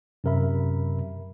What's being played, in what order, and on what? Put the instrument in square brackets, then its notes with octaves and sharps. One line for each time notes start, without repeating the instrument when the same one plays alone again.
[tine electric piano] F#2 C3 A#4 E5 B5